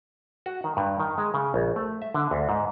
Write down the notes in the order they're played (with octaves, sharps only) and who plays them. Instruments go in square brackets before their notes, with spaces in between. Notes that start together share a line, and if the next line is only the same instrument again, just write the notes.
[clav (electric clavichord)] F#4
D#3
G2
D#3
G#3
C#3
A#1
A3
E5
D3
D2
G#2